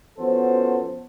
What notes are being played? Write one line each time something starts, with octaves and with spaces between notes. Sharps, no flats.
F3 B3 C#4 F#4 A4 C5